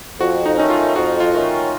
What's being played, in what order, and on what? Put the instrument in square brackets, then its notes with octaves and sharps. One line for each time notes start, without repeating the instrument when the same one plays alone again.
[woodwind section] F2 [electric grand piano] F#4
[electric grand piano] D#4
[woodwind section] D#3 A3 C#4 [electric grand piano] D#4
[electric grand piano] F4
[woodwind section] F2 [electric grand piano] F#4
[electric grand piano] F4
[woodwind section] D#3 A3 C#4